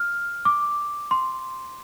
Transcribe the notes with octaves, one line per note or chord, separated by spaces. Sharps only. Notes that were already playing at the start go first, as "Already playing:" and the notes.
Already playing: F6
D6
C6